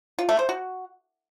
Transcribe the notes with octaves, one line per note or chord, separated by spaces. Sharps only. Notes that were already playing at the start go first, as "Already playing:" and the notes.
F4
A3
C5
F#4